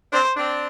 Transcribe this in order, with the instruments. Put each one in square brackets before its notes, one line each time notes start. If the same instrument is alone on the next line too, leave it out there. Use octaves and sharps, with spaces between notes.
[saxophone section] C4 D4 [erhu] C5
[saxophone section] C4 D4